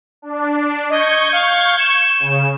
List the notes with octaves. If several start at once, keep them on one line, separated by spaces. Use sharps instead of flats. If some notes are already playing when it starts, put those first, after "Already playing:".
D4
D#5 C#6 G6 G#6
F5
E7
C#3